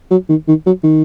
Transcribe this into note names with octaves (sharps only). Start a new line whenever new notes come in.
F#3
D#3
D#3
F#3
D#3